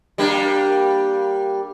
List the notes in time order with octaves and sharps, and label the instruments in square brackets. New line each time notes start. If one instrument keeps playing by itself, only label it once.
[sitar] G3 A#3 D4